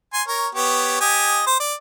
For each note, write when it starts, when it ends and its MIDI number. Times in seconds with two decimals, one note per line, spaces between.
0.13 0.22 80
0.13 0.22 84
0.28 0.48 70
0.28 0.48 73
0.55 0.97 59
0.55 0.97 67
0.55 0.97 73
1.01 1.43 67
1.01 1.43 75
1.01 1.43 80
1.47 1.57 72
1.60 1.74 74